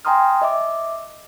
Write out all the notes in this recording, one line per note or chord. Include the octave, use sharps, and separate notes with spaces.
G5 G#5 A#5 C6 D#6 F6
D#5 E5 D6